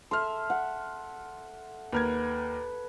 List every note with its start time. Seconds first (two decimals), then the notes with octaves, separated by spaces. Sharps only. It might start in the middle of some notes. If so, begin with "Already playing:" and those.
0.11 A4 E5 C6 F6
0.50 F#5
1.93 D#2 A#4 B4 G#6